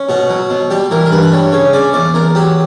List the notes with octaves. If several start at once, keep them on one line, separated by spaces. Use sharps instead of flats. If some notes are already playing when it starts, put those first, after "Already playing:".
Already playing: C#4
B2 F#4
F#3
B2
G3 G4
E3 A#4
A#4
G2 B4
B4
G3 C#5
C#3 C#5
C#4 D5
E2 D5
E2 A#4
F#3 G4